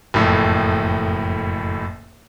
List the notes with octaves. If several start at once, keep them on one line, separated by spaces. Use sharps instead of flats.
F#1 F2 A2